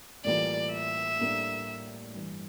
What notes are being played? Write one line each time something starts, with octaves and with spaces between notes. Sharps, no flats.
A2 E3 G3 A#3 F4 D5
E5
A2 G3 A#3 D4
G2 E3 G3